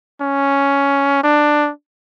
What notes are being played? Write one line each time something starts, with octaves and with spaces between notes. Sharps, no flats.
C#4
D4